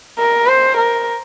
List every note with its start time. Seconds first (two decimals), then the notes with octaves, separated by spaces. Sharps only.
0.19 A#4
0.47 C5
0.77 A#4